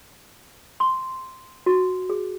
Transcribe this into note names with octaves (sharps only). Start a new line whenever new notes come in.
C6
F#4
G#4